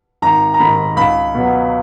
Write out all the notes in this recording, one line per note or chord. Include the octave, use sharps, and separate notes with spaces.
G#1 A#5
A#5
G#2 D#3 B5
C#2 B5
B2 F#3